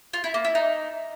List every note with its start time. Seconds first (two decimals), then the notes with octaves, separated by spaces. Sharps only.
0.13 F4
0.24 E4
0.34 A#3
0.45 E4
0.55 D#4